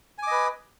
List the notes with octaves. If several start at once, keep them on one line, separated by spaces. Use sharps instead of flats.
B4 D#5 G#5 D6